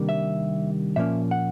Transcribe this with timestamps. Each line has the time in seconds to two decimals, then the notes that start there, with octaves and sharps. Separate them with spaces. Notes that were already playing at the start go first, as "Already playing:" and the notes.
Already playing: C3 D#3 G3 A#3 D4
0.09 E5
0.96 A#2 F3 A#3 C#4 E5
1.31 F#5